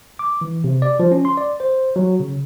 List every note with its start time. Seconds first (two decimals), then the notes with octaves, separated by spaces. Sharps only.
0.19 D6
0.41 E3
0.64 C3
0.82 D5
1.00 F3
1.12 C#4
1.25 C6
1.37 D5
1.60 C5
1.96 F#3
2.20 C#3